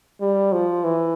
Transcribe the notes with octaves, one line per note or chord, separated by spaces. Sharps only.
G3
F3
E3